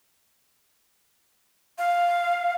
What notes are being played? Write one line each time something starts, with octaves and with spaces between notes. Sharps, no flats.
F5